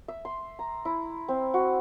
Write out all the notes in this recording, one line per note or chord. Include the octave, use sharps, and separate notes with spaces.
E5
C6
A#5
E4
C4
F#4